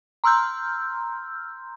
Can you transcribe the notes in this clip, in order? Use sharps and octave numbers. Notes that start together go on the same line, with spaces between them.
A#5 C6 E6 F6 G6